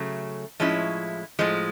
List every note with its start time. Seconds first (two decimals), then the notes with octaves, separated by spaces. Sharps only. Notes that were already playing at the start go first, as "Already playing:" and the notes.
Already playing: C#3 F#3 A3
0.60 A2 F3 G#3 C#4 E4
1.39 A2 F3 G#3